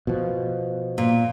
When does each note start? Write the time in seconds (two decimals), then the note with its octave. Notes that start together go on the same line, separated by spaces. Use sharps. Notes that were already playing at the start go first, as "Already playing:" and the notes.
0.07 B2 F3
0.98 A#2